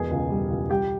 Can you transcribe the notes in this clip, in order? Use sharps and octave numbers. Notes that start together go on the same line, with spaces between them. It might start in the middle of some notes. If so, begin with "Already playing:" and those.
Already playing: E1 B2 G#4 G#5
C#2
G3
C#2
G3 G4 G5